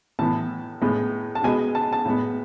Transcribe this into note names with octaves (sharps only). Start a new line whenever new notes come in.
A2 E3 B3 A5
A2 G#3 B3
A5
B2 G#3 B3 G#5
A5
A5
A2 G#3 B3